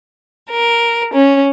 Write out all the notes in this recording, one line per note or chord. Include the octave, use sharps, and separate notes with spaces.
A#4
C#4